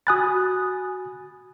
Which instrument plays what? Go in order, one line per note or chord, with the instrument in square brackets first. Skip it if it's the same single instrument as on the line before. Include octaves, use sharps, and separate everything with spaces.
[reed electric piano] F#4 G#5 B5 [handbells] D#6 F#6 A6